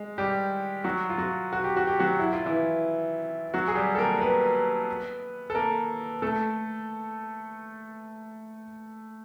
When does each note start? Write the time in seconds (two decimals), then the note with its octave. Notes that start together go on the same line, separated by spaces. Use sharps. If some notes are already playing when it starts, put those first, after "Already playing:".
Already playing: G#3
0.18 G3 G4
0.84 F#3 F#4
1.09 F4
1.18 F#3 F#4
1.53 F#4
1.64 G4
1.77 F#4
1.87 G4
1.99 F#3 F#4
2.19 E4
2.32 F4
2.46 E3 E4
3.54 F#3 F#4
3.68 G#4
3.76 G3 G4
3.95 A4
3.98 A#3 A#4
4.16 A#4
4.20 B3 B4
5.50 A4
5.55 A#3 A#4
6.22 A3 A4